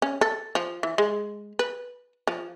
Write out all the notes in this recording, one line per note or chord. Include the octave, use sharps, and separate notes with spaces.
C#4
A4
F3
E3
G#3
B4
F3